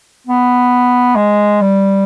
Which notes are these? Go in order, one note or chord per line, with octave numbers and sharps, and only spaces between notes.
B3
G#3
G3